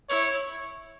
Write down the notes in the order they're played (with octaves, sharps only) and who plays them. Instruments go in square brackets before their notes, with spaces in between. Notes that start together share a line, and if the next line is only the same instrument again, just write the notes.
[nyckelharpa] E4 [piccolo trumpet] C#5